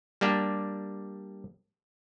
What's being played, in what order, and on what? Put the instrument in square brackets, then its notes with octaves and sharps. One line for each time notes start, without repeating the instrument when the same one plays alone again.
[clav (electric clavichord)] G3 A#3 D4 G4